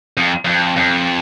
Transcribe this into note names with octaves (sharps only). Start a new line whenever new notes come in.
F2
F2
F2